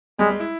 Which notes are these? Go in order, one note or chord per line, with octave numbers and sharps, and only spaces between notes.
G3 G#3
G#3
E4